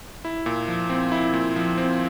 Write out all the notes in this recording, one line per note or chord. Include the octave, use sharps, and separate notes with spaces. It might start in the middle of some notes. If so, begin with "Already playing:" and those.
E4
A#2
F3
C4
E4
A#2
F3
C4